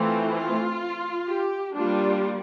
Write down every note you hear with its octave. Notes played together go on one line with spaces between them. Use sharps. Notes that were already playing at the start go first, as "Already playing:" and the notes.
Already playing: E3 A3 C4 F4
F4
G4
G3 A#3 D4 F4